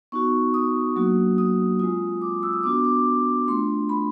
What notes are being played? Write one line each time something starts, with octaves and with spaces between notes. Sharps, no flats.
B3 D#4 F#4 C#6
D#6
F#3 A#3 D4 F#4
D#6
G#3 C4 F4 D#6
D6
E6
D#6
B3 D4 F#4 D6
D6
A3 D4 F4 C6
B5